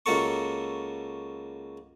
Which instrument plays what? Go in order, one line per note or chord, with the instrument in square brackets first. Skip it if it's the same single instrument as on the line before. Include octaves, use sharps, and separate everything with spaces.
[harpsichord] C#2 A#3 F#4 A4 C#6